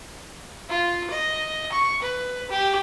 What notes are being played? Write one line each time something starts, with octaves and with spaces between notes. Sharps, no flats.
F4
D#5
C#6
B4
G4